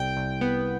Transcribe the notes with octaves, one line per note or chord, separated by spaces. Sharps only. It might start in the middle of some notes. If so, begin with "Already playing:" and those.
Already playing: C2 G5
C2
B3